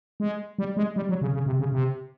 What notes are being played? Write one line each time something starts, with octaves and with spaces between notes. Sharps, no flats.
G#3
G3
G#3
G3
F#3
C#3
C#3
C3
C#3
C3